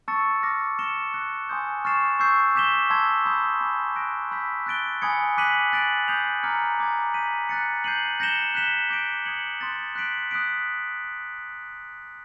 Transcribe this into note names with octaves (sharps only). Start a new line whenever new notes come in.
A5 C#6 E6 A6 C#7
D6 F6 A#6
F6 A#6 C#7 E7 G7
F#6 A#6 C#7
G#5 C6 D#6 G6
C#6 F6 A6 C7 E7
C#6 E6 G6 C7
D6 G6 B6 E7 G7
A5 C6 E6 G#6
B5 D#6 G6
G#5 B5 E6 G#6
F#6 A#6 D7
B5 E6 G6 B6
F#6 A6 D7 G7
G#5 B5 D#6 G#6 C#7
D6 F#6 B6 D#7 F#7
F#6 A6 D7 F#7
D#6 G6 C7 F7
A#5 D6 F6 G#6 C#7
A#5 D6 F6 G#6
G6 B6 D#7 F#7
F#6 A6 C#7
G6 C7 D#7 F#7
G6 A#6 C#7 E7 G7
F#6 B6 E7 G7
D6 G6 A#6 D7
D#6 G#6 C#7 F#7
C6 D#6 F#6 A6
F#6 B6 D7 F#7
D#6 F#6 B6 D7